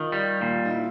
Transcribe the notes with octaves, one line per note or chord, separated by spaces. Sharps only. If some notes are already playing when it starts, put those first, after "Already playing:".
Already playing: D#3 F4
G3
A#2
D#4
E4